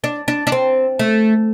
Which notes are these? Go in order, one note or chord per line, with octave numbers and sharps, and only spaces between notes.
D4
D4
D4
C4
A3